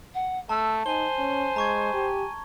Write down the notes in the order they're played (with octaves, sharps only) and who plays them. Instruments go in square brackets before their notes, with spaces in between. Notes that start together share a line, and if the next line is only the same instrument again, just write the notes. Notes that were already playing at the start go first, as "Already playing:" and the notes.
[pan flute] F#5
[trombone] A3 [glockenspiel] A5 [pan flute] E6
[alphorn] D#4 [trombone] C5 [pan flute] G#5 [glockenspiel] G7
[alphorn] C#4
[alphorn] G#3 [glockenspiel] A#5 C#6 G#6
[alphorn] G4